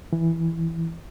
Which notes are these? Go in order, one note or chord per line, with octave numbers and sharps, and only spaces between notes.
E3